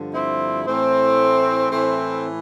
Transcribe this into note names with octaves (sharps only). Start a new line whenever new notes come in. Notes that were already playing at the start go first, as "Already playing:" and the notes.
Already playing: G2 D3 F3
C4 E4
A2 E3 A3 C4
A2 E3 A3 C4